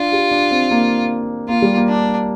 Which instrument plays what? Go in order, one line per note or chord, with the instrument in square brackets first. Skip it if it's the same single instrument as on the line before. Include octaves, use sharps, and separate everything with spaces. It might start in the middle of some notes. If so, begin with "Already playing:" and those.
Already playing: [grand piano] D4 [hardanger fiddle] F4
[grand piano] G4
D4
C4
A#3
[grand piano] A#3 [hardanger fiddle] F4
[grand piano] G3
A#3
[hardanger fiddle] D4